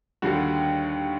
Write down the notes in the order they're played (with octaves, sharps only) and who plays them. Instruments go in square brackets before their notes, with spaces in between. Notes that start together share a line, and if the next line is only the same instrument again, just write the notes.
[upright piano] D#2 D3 G3 F#4